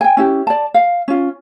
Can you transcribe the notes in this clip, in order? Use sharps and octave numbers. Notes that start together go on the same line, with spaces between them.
G5 G#5
C#4 E4 G4
D5 A5
F5
C#4 F4